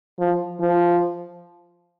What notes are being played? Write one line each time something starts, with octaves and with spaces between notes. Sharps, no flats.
F3
F3